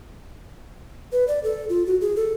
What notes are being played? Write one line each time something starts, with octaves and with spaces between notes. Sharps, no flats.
B4
D5
A4
F4
F#4
G#4
A4